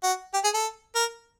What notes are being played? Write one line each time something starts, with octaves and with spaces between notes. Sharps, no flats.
F#4
G4
G#4
A4
A#4